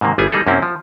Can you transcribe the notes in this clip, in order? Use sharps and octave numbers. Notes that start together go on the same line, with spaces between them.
G#2 C3 D#3 A#3
G1 G3 B3 E4 G#4 G#5
G3 A#3 D#4 G#4 A4
F#2 C3 A#3 C4 C#4 E4
F3